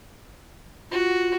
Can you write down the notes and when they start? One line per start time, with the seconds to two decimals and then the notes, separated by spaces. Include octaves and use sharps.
0.91 F4 F#4